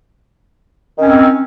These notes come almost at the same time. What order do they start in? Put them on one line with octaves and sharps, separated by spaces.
D#3 C#4 C4